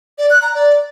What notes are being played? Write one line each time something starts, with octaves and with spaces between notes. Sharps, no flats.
D5
F#6
A#5
D5